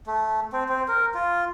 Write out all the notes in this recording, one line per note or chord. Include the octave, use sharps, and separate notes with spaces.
A3
C4
C4
A#4
F4